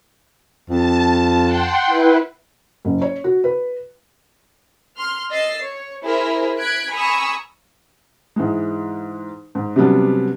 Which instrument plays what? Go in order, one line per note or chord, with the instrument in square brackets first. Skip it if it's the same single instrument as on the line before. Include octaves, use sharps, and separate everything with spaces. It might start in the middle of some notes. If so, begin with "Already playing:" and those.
[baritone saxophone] F2 [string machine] A5
[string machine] F#5 G5 C6
E4 B4
[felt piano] F#1
C#5
F#4
B4
[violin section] C6 F6
D#5 E6 A6 C7
C#5
E4 G#4 A#4 C5
F#6 G#6 B6 D7
G#5 A#5 B5 C#6 D#6 E6
[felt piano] G#2 E3 G#3
G#2
C3 F#3 G3 B3 C#4 D4